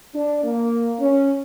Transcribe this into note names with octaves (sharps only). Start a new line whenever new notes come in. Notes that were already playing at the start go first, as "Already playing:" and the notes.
D4
A#3
C#4